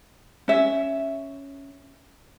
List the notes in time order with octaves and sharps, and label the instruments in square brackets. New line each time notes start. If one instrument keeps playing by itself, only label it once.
[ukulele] C#4 E5